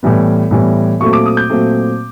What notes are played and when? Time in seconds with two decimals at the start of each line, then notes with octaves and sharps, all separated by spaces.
0.03 A2 E3 G3 B3
0.51 A2 E3 G3 B3
1.00 A#2 F#3 A3 C4 C#6
1.13 D6
1.26 D#6
1.37 G6
1.50 A#2 F#3 A3 C4